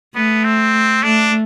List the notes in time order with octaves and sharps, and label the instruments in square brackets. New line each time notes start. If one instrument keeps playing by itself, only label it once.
[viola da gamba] A3 [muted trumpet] B3
[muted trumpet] C4
[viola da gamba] A3 [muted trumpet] D4